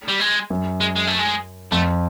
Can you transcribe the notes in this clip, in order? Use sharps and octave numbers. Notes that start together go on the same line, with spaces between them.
G3
G#3
F#2
G#3
G#3
A3
G#3
F2 A3